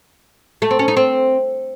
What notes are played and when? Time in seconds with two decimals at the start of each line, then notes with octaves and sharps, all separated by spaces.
0.62 A3
0.71 C4
0.79 C#4
0.88 D#4
0.97 C4